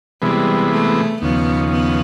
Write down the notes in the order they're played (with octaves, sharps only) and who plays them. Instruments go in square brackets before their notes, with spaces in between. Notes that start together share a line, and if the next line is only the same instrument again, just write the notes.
[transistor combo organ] C3 E3 G#3 B3 [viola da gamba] G3
[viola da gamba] A3
[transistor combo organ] D#2 C#3 F3 [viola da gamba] B3
[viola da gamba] B3